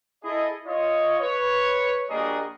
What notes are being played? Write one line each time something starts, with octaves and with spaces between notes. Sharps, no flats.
E4 G#4 A4 D#5
F4 C#5 D#5
B4 C#5
A#1 G3 F#4 G#4 A#4 D#5